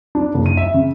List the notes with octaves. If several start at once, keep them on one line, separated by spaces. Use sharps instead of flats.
D4
F#1
D#7
E5
C#3